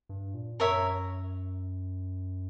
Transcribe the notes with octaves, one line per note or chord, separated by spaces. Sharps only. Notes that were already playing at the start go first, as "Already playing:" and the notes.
G2
A#2
F#2 A#4 C#5 E5